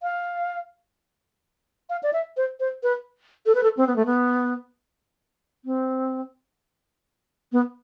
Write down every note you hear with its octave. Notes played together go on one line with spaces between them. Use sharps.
F5
F5
D5
E5
C5
C5
B4
A4
B4
A4
C4
B3
A3
B3
C4
B3